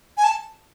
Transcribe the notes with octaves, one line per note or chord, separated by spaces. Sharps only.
G#5
A5